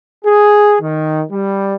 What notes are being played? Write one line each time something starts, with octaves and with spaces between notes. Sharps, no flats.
G#4
D#3
G3